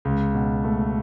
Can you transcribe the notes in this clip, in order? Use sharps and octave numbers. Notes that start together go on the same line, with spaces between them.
C#2
B2
A3